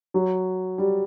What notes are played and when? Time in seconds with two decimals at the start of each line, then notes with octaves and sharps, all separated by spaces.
0.14 F#3
0.78 G3